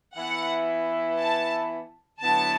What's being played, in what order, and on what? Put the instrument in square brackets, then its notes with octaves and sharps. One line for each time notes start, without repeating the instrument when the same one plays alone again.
[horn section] E3 B3 E4 [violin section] F#5
[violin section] A5
[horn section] D3 F#3 B3 E4 [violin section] A5